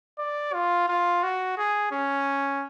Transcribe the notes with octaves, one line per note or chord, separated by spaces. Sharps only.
D5
F4
F4
F#4
G#4
C#4